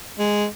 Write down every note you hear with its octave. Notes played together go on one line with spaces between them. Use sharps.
G#3